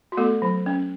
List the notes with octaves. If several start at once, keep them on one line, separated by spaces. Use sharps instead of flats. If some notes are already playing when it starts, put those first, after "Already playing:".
F#4
A3 B3 A4
F#3
C#4